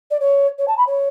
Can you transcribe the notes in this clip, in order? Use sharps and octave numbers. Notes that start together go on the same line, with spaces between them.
D5
C#5
C#5
A5
B5
C#5